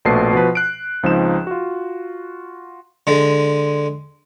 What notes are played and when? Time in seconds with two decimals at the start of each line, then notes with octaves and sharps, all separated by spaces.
0.05 A#1 B2 A3 B4 A5 C7
0.33 B2 F3 B4
0.55 F#6 D7
1.03 C#2 F3 C4 D#4 E7
1.47 F4 F#4
3.07 D3 G#3